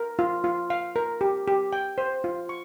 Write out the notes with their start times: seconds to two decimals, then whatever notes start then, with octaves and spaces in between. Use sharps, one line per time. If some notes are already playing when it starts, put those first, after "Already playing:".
Already playing: A#4
0.19 F4
0.44 F4
0.70 F5
0.96 A#4
1.21 G4
1.48 G4
1.73 G5
1.98 C5
2.24 F4
2.49 C#6